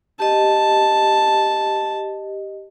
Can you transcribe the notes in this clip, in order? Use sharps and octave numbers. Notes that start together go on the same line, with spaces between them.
G4 D#5 A5